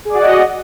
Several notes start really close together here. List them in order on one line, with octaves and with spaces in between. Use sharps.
G#4 D5 F#4 F#5 D#5